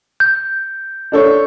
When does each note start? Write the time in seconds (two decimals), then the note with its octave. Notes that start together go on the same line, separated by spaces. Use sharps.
0.20 G6
1.12 D4 A4 C#5